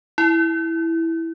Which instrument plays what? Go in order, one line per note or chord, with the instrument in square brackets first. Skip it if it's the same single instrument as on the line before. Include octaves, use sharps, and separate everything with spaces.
[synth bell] E4